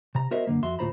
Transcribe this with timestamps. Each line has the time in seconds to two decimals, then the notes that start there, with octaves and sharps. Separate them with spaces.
0.15 C3 A#5
0.31 B3 F#4 A#4 C5 D#5 E5
0.47 F#2 D3 A#3
0.63 F2 F#4 E5 C6
0.79 D2 A2 F4 C5 A#5 B5